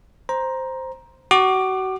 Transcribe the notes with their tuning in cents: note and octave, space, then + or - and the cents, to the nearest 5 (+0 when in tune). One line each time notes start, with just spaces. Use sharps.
C5 +0 A#5 +15
F#4 +30 D6 +25